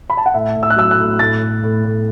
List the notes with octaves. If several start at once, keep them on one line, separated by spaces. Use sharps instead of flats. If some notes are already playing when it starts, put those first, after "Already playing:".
B5
A5
F#5
A2 E5
A2
E6
F#6
F#3 E6
F#6
A2
A2 A6
A2
A2
A2